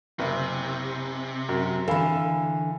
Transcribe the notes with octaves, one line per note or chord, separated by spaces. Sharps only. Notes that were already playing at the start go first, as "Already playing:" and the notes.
F#1 C3
F#2
D3 E3 A4 F5 B5